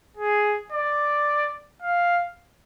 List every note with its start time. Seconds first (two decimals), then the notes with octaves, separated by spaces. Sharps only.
0.17 G#4
0.72 D5
1.82 F5